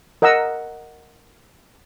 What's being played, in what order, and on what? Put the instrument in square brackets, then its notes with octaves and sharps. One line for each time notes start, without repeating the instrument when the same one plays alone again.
[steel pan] A#4 D#5 F#5 A#5 E6